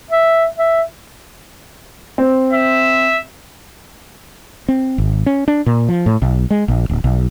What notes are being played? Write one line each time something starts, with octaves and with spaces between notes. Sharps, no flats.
E5
E5
C4
E5
C4
G#1
C#4
D4
A#2
F3
A2
B1
G#3
A#1
D1
B1